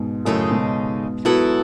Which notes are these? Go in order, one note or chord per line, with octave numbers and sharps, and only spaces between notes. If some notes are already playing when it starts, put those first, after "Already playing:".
Already playing: G#2 B2
F#2 A2 C#3 G#3 D#4 A4
G#2 B2
F#3 B3 E4 A4